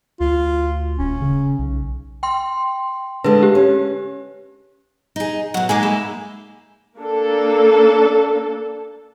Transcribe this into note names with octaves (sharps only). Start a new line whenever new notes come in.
D2 F4
D#1 C#4
C#3
B1
G5 C6
D3 G#3 B4
G4
C#4
D#4 G#4
B2 F#3 F#5
G#3 A#3 D#4 G#4 D6
E5 B5
A#3 D4 A4